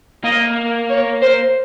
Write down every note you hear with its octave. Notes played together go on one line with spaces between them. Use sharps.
A#3 D#5
C#5
C5